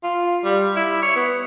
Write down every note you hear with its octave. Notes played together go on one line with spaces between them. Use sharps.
F4
G3
E4
C#5
B3